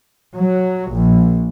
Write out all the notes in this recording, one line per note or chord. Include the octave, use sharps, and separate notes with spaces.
F#3
A#1